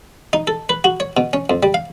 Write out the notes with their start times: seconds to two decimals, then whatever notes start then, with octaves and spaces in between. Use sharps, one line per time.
0.33 D#4
0.47 A4
0.69 B4
0.84 F#4
1.00 C#5
1.17 B2
1.33 C#4
1.50 F2
1.63 G3
1.74 F5